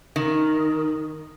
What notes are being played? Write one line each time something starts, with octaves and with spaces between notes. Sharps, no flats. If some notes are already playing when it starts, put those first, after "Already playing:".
D#3